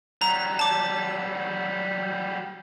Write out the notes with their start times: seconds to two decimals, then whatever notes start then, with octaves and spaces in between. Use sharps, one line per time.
0.21 F#3 G3 A#5
0.59 A5 D6